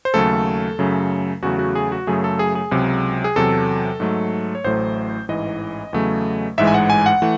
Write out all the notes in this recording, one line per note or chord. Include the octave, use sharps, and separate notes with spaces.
C5
D#2 C#3 F#3 A3 A4
F#2 C#3 F#3 A3
E2 C#3 F#3 A3 F#4
F#4
G#4
F#4
F#2 C#3 F#3 A3 G#4
A4
G#4
G#4
C#2 C3 F#3
G#4
E2 C3 F#3 A4
G#2 F#3 A3
C#5
A1 A2 F#3 A3 C5
A1 G#2 E3 D#5
E2 C#3 F#3 A3
A1 G#2 E3 G#3 E5
G#5
F#5
G#5
F#5
E3 A3